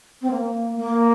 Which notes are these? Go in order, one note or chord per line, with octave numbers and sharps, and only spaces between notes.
C4
A#3
A#3